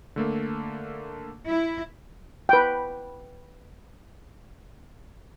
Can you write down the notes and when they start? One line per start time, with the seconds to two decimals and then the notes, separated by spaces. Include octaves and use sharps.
0.16 D3 A3 A#3
1.47 E4
2.49 B4 G5